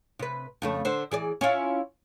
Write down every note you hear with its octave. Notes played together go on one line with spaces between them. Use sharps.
C3 B4
F2 C#3 A3
D3 C5
E3 G#4 D5
C#4 E4 F4